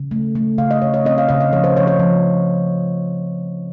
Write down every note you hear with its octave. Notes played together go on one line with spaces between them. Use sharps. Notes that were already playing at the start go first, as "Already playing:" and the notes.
Already playing: C#3
A3
A3
C#3 F5
D#5
C#3 C#5
C#5
C4 D#5
F5
C#3 D#5
F5
F3 C#5
C5
F3 C#5
C#5
F3